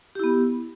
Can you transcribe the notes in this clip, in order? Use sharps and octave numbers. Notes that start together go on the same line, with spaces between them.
B3 E4 G4